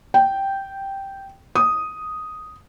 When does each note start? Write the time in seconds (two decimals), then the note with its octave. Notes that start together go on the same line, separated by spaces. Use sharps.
0.14 G5
1.55 D#6